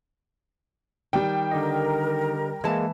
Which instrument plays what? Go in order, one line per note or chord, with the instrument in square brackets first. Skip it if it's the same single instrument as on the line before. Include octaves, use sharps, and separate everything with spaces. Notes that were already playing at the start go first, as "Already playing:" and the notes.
[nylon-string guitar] D#3 [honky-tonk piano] G3 G5
[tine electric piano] D3 G4 D#5 [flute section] A#4
[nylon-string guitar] E3 A5 [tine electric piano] G#3 A#3